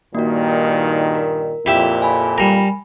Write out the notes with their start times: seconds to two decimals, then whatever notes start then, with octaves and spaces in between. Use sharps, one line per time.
0.15 G2 A#2 D#3 A#3 F#4
1.15 A#4
1.66 F2 A#2 E4 G4 E5
2.02 G#5 B5
2.38 G3 A#4